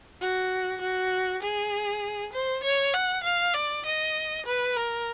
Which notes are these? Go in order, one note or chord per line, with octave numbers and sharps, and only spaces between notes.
F#4
F#4
G#4
C5
C#5
F#5
F5
D5
D#5
B4
A#4